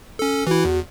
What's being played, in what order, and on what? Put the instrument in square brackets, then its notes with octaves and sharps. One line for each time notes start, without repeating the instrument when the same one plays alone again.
[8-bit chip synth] C#4 A4
[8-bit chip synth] E3 E4 [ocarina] F#4
[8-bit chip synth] E2